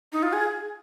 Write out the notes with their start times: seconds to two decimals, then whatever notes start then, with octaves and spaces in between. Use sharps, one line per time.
0.12 D#4
0.22 F4
0.33 G#4